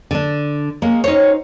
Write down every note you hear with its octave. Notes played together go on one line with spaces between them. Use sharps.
D3 D4
G#3 A#3 C#4
C#4 D#4 F#4 C5 C#5